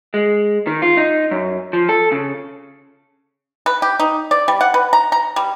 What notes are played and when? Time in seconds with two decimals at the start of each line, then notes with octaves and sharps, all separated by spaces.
0.14 G#3
0.67 D#3
0.82 F4
0.97 D#4
1.31 F#2
1.73 F3
1.89 A4
2.12 C#3
3.66 B4
3.82 G4
4.00 D#4
4.31 D5
4.48 G3
4.61 F#5
4.74 B4
4.93 A#5
5.12 A#5
5.36 G3